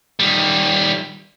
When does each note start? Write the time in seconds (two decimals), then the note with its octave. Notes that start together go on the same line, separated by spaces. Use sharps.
0.19 D#3 G3